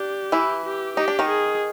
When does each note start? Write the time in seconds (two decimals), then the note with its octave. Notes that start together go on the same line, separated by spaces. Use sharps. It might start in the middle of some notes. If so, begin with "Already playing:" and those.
Already playing: D4 G4
0.32 E3 E4
0.65 G4
0.96 D#4 G4
1.08 D4
1.19 D#3 D#4
1.29 G#4